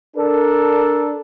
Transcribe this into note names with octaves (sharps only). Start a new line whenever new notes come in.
D4 A4 A#4